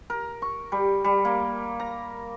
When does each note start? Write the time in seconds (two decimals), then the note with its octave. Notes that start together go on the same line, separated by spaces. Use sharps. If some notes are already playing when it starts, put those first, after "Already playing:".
0.10 A#4
0.42 C#6
0.72 G3
1.04 G3
1.25 A#3
1.80 A#5